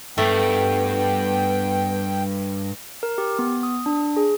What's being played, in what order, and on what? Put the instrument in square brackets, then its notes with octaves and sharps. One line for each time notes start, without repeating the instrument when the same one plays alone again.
[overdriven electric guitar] G2 [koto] A3 [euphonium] B3 [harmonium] G5
[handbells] A#4
G4
B3
D#6
D4
G#4